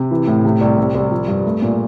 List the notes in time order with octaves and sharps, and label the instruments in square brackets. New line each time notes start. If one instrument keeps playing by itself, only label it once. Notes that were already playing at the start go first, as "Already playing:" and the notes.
Already playing: [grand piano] C3
E3
A2
C3
C2
C3
C2
F3
G2
A3
A#2